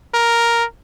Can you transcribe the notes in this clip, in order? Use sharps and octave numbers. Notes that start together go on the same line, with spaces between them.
A#4